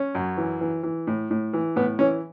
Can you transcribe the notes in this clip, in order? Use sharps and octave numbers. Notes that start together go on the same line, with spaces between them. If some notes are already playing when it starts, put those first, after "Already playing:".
Already playing: C#4
F#2
E3
E3
E3
A2
A2
E3
A2 B3
E3 C#4